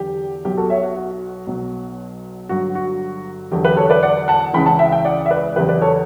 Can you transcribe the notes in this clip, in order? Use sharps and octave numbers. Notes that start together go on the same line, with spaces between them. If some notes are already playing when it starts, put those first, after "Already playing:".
Already playing: E2 D3 F#3 G4
B1 B2 F#3 G4
F#4 A4
C#5 E5
F#4
F#4
B1 B2 F#3
G1 G2 F#3 F#4
F#4
E2 D3 F#3 G4
G4 B4
A4 C#5
B4 D5
D5 F#5
F#5 A5
C#2 C#3 E3 G5 B5
F#5 A5
E5 G5
E5 G5
D5 F#5
E5
B4 D5
E2 C#3 F#3 G4 B4
B4 D5
A4 C#5